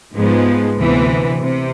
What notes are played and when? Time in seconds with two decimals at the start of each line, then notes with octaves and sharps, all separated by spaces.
0.15 G#2 F3 G#3 B3
0.78 D2 C3 E3 B3
1.42 C3